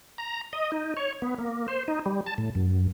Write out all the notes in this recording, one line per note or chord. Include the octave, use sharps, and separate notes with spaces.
A#5
D#5
D#4
C#5
B3
A#3
C5
D#4
G3
A5
A2
F#2